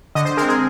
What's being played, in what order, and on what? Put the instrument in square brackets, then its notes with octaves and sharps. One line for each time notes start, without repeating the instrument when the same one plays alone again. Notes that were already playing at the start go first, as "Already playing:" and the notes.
[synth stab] D3 D#5
C5
G#3 A#4
C4
G#4